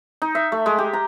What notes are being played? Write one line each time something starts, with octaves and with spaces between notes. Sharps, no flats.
D#4
E5
A3
G#3
G4
A#5